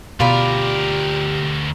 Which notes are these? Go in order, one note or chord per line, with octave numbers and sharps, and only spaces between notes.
D2 B2 F4 G4 A#4 D5 B5